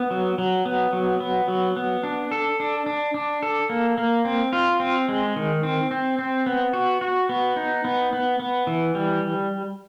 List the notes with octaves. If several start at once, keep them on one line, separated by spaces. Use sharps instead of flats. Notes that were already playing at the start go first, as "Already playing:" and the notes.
Already playing: B3
F#3
F#3
B3
F#3
B3
F#3
B3
D4
A4
D4
D4
D4
A4
A#3
A#3
C4
F4
C4
G#3
D#3
C4
C4
C4
B3
F#4
F#4
B3
D#4
B3
B3
B3
E3
G3